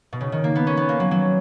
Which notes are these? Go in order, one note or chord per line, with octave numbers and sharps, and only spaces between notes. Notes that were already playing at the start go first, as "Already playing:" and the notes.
B2
C#3
D#3
A#3
B3
C#4
B3
A#3
F#3
F#3